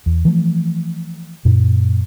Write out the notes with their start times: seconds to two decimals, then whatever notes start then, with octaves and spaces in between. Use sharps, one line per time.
0.06 E2
0.25 E3 F3 A3
1.45 F#2 A#2